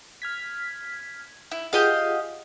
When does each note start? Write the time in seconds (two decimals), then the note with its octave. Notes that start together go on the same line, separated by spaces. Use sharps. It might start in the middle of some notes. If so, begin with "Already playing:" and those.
0.22 F6 G#6 B6
1.52 E4
1.73 F4 G4 G#4 D#5 F5 F#5